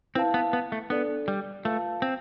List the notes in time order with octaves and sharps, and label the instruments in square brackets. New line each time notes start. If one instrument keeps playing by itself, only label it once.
[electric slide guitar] C4 [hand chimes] E4 B4 F5 A5
[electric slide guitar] B3
B3
A3
[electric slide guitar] B3 [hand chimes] D4 A4 D5
[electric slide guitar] G3
[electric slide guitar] A3 [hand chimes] F4 B4 F5 A5
[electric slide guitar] C4